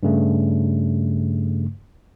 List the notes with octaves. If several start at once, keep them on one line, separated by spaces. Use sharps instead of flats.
G2 C#3 A3